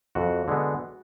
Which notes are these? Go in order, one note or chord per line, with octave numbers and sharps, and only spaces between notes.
F2 F#4
D3 G#3 B3